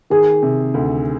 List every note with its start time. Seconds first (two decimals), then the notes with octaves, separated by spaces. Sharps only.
0.10 D#3 G#4
0.42 C3
0.74 D2